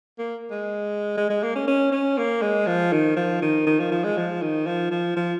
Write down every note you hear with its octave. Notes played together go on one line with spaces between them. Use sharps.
A#3
G#3
G#3
G#3
A#3
C#4
C#4
C#4
A#3
G#3
F3
D#3
F3
D#3
D#3
F3
F3
G#3
F3
D#3
F3
F3
F3